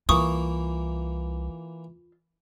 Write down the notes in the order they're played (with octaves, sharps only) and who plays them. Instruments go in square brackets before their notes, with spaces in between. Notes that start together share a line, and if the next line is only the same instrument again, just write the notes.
[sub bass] C2 [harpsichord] E3 A#3 [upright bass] F4 [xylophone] C#6 D#6